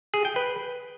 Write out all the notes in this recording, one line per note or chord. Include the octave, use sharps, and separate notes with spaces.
G#4
G5
B4